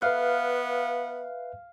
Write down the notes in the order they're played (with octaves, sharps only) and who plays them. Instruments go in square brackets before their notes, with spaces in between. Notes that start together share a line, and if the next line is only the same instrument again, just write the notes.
[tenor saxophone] B3 [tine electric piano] B4 E5 F#6 [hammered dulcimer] F5